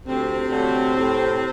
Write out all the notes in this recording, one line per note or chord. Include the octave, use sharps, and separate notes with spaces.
D2 C3 C4
D3 F#3 A3
A2